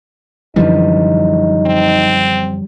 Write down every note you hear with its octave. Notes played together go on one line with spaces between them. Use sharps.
F#2 D3 E3 F3 G3 D#4
C4